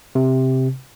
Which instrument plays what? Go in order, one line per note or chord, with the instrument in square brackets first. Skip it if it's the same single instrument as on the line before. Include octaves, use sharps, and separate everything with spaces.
[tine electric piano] C3